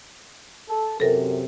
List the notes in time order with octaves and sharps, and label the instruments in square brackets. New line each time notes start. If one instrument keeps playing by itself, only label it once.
[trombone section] A4
[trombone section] F#2 C3 [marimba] A4 A#4